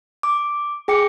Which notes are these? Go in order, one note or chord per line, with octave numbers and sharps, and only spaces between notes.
D6
G#4 G5 D6 C#7